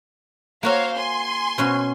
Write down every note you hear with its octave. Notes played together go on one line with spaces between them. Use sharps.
A#3 F#4 A#4 C5 C#5 F5
G#5 C6
B2 C#4 F#4